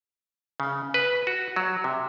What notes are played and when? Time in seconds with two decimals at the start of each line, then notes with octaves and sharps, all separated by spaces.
0.60 C#3
0.94 B4
1.27 F#4
1.56 F#3
1.84 C3